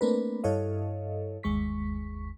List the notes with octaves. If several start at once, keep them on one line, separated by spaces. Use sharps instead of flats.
A3 A#3 C4 D4 A#4 B4
G2 E4 A4 C#5 D#5 F5
G1 D#2 G#3 C#6 B6